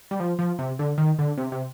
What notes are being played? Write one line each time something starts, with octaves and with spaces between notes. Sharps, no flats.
G3
F3
F3
C3
D3
D#3
D3
C3
C3